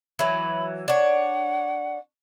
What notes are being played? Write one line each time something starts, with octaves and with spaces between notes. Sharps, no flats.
E3 F#3 B5
D4 C#5 F#5